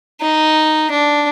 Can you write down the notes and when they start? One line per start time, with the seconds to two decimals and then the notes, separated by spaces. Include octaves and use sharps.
0.21 D#4
0.91 D4